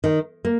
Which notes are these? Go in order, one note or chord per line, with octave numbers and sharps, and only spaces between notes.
D#3
A#3